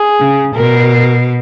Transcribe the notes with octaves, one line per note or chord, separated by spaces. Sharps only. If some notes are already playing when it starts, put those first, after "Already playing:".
Already playing: G#4
C#3
B2 A#4